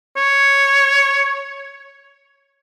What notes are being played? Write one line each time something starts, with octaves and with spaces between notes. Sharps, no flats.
C#5